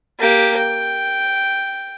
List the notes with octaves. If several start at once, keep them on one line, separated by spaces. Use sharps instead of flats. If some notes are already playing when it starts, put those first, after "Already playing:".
A#3 G4
G5